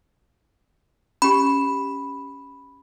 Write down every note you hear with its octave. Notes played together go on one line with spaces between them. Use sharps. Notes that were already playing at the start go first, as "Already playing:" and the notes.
C#4 G4 B5